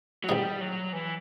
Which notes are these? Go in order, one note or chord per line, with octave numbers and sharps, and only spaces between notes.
F#3
A1 G#2 D#3 G3
F#3
E3